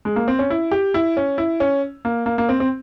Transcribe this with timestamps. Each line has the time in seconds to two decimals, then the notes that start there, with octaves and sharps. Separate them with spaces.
0.05 G#3
0.16 A#3
0.28 C4
0.39 C#4
0.50 E4
0.71 G4
0.94 E4
1.17 C#4
1.38 E4
1.60 C#4
2.05 A#3
2.26 A#3
2.38 A#3
2.49 C4
2.60 C4